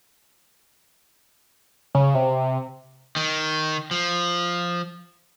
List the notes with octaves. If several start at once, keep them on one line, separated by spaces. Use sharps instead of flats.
C#3
C3
D#3
F3